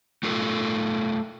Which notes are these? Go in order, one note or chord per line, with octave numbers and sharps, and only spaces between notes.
A3 F4 A4 A#4